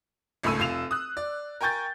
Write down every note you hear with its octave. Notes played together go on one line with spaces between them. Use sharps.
G#1 C#2 A3 B5 E6 D#7
F1 F4 C7 E7 F7
D#6 F#6
D5
A#4 G5 G#5 C#6 G6 A6